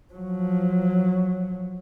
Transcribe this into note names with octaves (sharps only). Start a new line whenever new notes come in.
F3 F#3